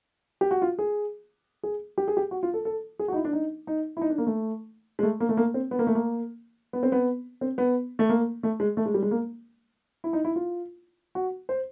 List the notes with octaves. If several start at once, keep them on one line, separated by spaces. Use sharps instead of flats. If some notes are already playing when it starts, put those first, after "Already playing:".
G4
F#4
F4
G#4
G#4
G4
G#4
G4
F#4
F4
A4
A4
G#4
F#4
D#4
E4
D4
D#4
D#4
E4
D#4
D4
A#3
A3
G#3
A3
A#3
A3
A#3
C4
B3
A#3
A3
A#3
B3
C4
B3
C4
B3
A3
A#3
A3
G#3
A3
G#3
G3
G#3
A#3
E4
D#4
E4
F4
F#4
C5